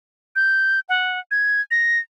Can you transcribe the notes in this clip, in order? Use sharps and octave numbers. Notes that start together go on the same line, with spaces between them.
G6
F#5
G#6
A#6